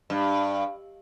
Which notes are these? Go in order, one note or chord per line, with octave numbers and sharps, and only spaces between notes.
G2